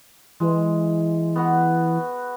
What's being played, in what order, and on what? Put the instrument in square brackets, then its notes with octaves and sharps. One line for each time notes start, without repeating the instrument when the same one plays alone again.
[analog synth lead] E3 [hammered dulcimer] G#3
[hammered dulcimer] B3 F#4 B4